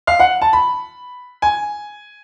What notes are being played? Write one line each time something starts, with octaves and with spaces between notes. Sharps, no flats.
F5
F#5
A5
B5
G#5